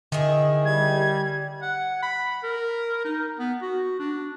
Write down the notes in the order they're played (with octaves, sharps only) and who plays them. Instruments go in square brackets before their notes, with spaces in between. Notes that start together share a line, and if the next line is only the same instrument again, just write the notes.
[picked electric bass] D3 [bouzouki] D#3 E4 G#4
[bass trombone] G3 [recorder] G#6
[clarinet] F#5
B5
A#4
D#4
B3
F#4
D4